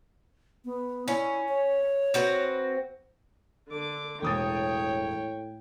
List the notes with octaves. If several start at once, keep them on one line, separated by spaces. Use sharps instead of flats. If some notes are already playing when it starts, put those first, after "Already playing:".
B3
C#4 E4
C#5
C4 F#4 B4
D3 D6
E1 A2 C#5 G5 D#6 A6